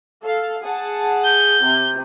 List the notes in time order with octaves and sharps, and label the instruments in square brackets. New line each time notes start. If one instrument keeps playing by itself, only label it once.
[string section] A4 F5
G#4 F#5 A5
[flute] G6 [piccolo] G7
[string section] C3